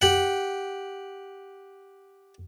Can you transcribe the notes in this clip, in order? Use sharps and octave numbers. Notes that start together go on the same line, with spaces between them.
G4 F#5